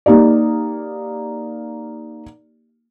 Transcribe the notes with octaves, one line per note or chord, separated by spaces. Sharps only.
A#3 D#4 G4 D5